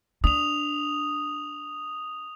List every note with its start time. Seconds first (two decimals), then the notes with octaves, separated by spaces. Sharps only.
0.24 D4 D#6 F7